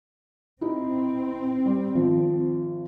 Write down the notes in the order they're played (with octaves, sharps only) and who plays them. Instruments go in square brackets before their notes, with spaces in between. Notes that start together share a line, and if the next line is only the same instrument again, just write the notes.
[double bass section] C4 [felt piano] D#4 E4
[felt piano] G3
G#1 F3